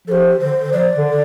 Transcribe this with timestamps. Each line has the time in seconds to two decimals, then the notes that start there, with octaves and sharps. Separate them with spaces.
0.08 F3 A4
0.12 G4
0.40 D3 C5
0.73 F3 D5
0.96 D3